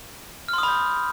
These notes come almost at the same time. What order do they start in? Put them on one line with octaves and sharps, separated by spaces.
F6 C6 D#6 B5 G6